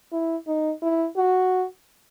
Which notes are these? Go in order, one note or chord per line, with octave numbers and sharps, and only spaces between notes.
E4
D#4
E4
F#4